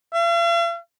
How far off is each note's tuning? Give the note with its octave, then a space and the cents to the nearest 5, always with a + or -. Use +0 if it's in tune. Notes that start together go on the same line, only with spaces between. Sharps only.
F5 -45